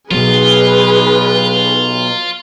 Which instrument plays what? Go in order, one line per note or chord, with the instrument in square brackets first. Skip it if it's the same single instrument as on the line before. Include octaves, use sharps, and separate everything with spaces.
[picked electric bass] B2 F#3 [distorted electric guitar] F4 [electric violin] G#4 B4